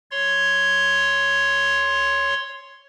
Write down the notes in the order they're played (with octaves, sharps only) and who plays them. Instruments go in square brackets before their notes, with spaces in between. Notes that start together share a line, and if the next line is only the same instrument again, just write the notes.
[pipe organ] C#5 C6